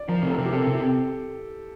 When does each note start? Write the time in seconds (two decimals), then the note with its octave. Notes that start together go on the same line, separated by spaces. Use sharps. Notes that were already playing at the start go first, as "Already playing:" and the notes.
Already playing: D5
0.09 F3 A#4
0.23 C3 A4
0.30 A#4
0.38 C3
0.45 G4
0.53 C4 A4
0.67 C3
0.75 G4